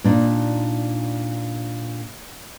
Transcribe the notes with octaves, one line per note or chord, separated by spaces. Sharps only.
A#2 D4 D#4